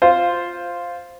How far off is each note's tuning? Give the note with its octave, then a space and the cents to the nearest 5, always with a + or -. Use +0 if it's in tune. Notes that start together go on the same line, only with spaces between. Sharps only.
F4 +0 C5 +0